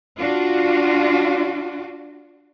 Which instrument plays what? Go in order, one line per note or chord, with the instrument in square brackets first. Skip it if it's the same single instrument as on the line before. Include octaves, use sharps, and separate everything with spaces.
[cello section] D4 F4 F#4